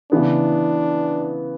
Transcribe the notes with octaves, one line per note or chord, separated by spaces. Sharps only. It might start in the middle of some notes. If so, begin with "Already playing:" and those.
C#3 E3 B3 D4